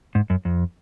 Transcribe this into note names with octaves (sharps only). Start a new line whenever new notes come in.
G#2
F#2
F2